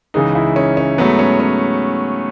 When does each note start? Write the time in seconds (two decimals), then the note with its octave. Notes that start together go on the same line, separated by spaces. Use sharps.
0.14 C#2 C#3 E3 G#3 D#4
0.35 E4
0.56 C#4
0.77 C#4
0.98 G#2 F#3 A3 B3
1.19 C#4
1.40 C#4